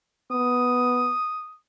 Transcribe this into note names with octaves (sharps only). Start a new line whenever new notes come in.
B3 D#6